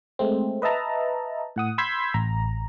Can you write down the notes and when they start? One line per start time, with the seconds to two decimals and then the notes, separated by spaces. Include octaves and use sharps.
0.19 G#3 A3 C4
0.62 B4 D#5 E5 A5 A#5
1.56 A2 F#5 D#6
1.78 B5 C6 E6 G6 G#6 B6
2.14 A1 A#5